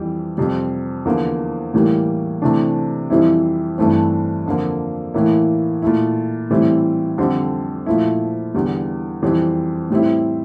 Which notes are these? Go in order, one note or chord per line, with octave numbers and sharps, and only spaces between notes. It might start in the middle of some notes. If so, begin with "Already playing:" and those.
Already playing: F2 E3 G3
F2 C3 G3
E2 D3 F3 A#3
A2 E3 G3 A#3
C3 E3 A3 D4
F2 E3 G3 C4 E4
G2 E3 A3 C4
F2 D3 F3 A#3
A2 E3 A#3 E4
A#2 A3 E4
A2 E3 G3 C4 E4
F2 D3 G3 C4
A#2 F3 A3 E4
E2 D3 G3
F2 E3 G3 C4
A2 G3 C4 E4